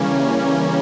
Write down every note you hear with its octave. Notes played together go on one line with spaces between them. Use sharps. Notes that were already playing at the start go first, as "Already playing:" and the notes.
Already playing: C#3 E3 G3 A#3 C#4